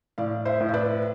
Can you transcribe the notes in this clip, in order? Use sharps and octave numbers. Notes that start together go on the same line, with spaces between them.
A2 D5 F5
C5 E5
A2
E5
B4 D5